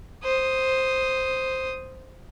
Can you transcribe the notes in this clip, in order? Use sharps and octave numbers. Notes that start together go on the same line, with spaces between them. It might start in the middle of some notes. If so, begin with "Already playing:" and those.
C5 D#6